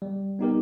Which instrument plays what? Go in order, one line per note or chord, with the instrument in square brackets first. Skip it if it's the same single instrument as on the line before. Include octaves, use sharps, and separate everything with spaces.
[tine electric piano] G3
B3 D#4 G4 A#4